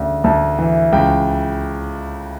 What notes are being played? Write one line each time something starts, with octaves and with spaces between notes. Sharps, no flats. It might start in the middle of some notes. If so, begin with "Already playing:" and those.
Already playing: D2 C#3
D2 A5
E3
C#2 G5